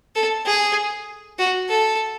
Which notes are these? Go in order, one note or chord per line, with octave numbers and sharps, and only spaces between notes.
A4
G#4
F#4
A4